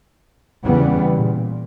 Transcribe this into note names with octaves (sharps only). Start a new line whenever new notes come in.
E2 C#3 E3 G3 B3
A#2